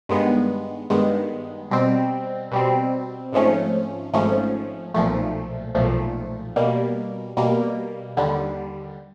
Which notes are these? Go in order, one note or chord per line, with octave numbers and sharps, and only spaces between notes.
G2 D#3 G#3 B3
G2 D#3 G#3 B3
B2 G3 C4
B2 G3 C4
G#1 G#2 F3 A3 C#4
G#1 G#2 F3 A3 C#4
B1 A#2 F3 A3
B1 A#2 F3 A3
B2 G3 A#3
B2 G3 A#3
D#2 D3 G3